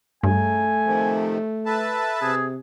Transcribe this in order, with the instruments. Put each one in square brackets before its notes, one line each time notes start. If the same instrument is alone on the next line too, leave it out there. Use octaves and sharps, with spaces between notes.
[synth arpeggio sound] G2 [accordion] C#3 [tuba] A3 [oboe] G#5
[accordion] C3 D#3 F3
[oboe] A4 [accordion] B4 E5 A5
[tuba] C3 [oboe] G#4